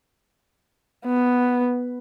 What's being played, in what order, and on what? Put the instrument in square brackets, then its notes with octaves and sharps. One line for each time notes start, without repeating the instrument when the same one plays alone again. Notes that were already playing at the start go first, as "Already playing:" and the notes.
[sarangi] B3